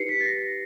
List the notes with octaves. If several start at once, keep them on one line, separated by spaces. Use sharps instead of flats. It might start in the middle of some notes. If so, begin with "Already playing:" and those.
Already playing: D#4 G4 B4 C7 C#7
B6
A6
A#6